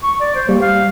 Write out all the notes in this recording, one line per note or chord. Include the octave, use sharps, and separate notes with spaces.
C#6
D5
C5
G3 A#3
F5